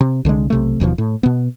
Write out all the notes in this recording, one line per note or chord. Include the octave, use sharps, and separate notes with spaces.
C3
C2 D3 E3 G#3
B1 C3 A3
D#1 D#2 B2 F3
A2
B2 B3